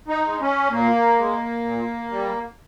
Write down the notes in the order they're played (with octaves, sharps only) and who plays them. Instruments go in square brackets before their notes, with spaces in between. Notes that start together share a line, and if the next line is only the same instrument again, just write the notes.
[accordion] D#4
G#3
C#4
A#2 A#3
G#3
A#2
G3